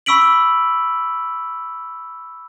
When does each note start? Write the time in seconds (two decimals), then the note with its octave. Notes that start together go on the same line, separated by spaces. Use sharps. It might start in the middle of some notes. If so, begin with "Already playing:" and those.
0.06 B5 C#6 E6 B6 D7 F#7